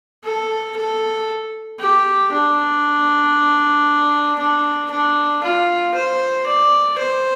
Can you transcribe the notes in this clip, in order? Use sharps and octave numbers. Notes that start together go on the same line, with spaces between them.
A4
A4
G4
D4
D4
D4
F4
C5
D5
C5